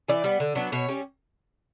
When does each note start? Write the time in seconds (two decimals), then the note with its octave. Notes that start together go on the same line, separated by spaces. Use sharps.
0.08 E3 D5
0.24 G3 B3
0.40 D3
0.55 F#3 B3 D4
0.72 B2 C#5
0.89 G3 C#4